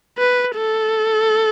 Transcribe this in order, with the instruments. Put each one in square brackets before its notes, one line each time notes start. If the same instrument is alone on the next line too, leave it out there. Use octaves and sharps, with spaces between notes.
[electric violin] B4
A4